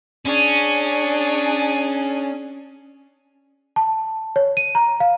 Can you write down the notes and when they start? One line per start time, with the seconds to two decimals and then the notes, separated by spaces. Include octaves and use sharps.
0.25 C#4 D4 G#4
3.76 A5
4.36 C#5
4.57 D#7
4.75 A#5
5.00 F5